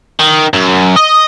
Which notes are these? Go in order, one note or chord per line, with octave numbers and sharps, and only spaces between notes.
D#3
F#2
D#5